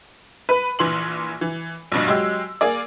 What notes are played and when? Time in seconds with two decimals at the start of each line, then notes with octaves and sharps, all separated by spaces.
0.49 B4 B5
0.79 A#1 E3 C6 F#7
1.41 E3
1.92 A#1 G2 B2
2.07 F#3 G#3 G4 E6
2.61 A#3 G#4 D5